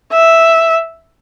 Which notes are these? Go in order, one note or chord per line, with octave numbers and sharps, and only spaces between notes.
E5